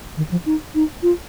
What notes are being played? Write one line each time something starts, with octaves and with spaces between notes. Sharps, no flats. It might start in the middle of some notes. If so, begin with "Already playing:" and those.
D#3
F3
D#4
D#4
F4